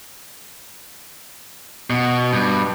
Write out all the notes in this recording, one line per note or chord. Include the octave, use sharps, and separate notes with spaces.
B2
G2